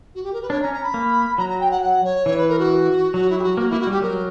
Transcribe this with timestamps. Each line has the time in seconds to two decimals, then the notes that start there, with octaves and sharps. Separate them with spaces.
0.14 F#4
0.23 G4
0.33 A#4
0.42 B4
0.50 D4 C#5
0.61 A#5
0.65 C#4
0.73 A#5
0.83 B5
0.94 A#3
1.37 F#3 A#5
1.49 A#5
1.60 G5
1.70 F#5
1.81 F#5
2.04 C#5
2.26 E3 C#5
2.37 B4
2.48 A#4
2.58 F#4
3.14 F#3 F#4
3.29 E4
3.38 G4
3.43 F#4
3.57 A#3 F#4
3.69 A#3 E4
3.79 F#4
3.87 G3 G4
4.01 F#3 A#4